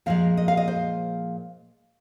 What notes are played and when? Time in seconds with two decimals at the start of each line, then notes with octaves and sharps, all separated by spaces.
0.06 A#2 F3 G#3 F5
0.37 D#5
0.48 F5
0.57 D#5
0.68 C5